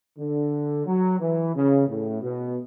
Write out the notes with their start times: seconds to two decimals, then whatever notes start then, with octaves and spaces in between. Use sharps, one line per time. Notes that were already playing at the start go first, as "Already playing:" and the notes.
0.18 D3
0.86 F#3
1.20 E3
1.55 C#3
1.88 A2
2.22 B2